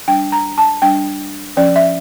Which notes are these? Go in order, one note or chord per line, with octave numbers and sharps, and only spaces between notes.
G3 D4 G5
A#5
A5
G3 D4 G5
F3 C#4 D5
E5